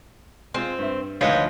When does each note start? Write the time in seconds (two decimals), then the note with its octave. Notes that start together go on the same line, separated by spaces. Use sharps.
0.54 G#3 C4 F4
0.79 G2 E5
1.21 G#1 D2 G#2 F3 B4 C#5 D#5